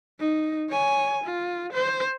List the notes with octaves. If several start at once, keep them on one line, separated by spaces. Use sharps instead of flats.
D#4
C#5 G#5
F4
C5